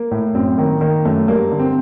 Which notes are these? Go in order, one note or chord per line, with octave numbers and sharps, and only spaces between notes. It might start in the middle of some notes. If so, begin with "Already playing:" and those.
Already playing: A#3
A2
F#2 C4
D#3 A#3
D#3 A#3
F#2 A3
G2 A#3
D3
C4